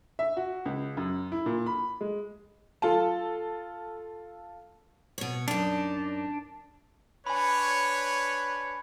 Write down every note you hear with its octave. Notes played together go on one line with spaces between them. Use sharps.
E5
F#4
C#2
F#2
E4
A#2
B5
G#3
F4 A4 A5
B2 C#5
F#2 D4 D#4
D4 B4 C#5 G#5 B5